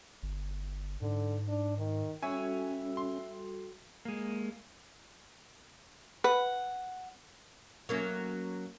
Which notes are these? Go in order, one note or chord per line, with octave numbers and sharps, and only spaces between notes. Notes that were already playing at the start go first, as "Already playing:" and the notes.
G1
G#2 D3
D4
D#3
G3 C#4 E4 F#4 A4 C#5 E5 G#5
C6
G#3 A#3
B4 F#5
F#3 A#3 C#4